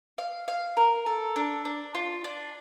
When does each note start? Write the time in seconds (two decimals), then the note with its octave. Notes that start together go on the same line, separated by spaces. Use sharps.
0.18 F5
0.48 F5
0.77 A#4
1.06 A4
1.36 D4
1.65 D4
1.95 F4
2.24 D4